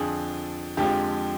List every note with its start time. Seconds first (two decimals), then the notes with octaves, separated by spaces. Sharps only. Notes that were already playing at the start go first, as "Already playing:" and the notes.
Already playing: F2 D3 F3 G#4
0.77 F2 D3 F3 G#3 G4